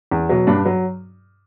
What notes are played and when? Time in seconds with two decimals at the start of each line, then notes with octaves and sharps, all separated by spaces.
0.11 E2
0.29 B2 F#3
0.47 G2 D4
0.66 F#3